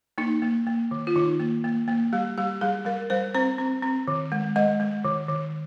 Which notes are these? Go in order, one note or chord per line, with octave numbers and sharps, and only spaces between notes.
A#3 D#4
A#3
A#3
D#3
F4
D#3 D#4
A#3
A#3
A#3
G3 G4
G3 G4
G3 G#4
G3 A#4
G3 C5
C4 C5
C4
C4
D#3
G#3
G#3 D#5
G#3
D#3
D#3